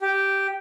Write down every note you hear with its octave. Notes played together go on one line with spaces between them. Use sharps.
G4